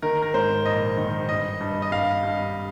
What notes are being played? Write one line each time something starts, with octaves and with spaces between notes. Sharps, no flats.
D#3 A#4
A#4
G#2 C5
A#1 D#5
D#3
G2 D#5
G2
D#5
G2 F5
G2